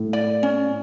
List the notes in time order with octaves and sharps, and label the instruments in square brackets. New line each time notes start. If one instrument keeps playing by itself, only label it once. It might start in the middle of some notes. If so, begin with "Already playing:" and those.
Already playing: [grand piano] A2
[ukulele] D5
C#4